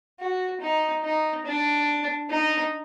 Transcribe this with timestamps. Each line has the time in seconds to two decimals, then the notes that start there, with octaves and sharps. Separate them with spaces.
0.20 F#4
0.61 D#4
1.04 D#4
1.46 D4
2.30 D#4